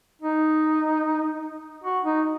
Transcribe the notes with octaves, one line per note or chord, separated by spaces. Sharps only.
D#4
F#4
D#4